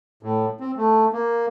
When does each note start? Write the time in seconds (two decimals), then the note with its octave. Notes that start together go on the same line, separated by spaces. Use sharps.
0.23 A2
0.60 C4
0.77 A3
1.13 A#3